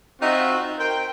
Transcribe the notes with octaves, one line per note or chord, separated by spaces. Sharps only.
C4 D#4 F4 F#4 E5
A#4 C5 G5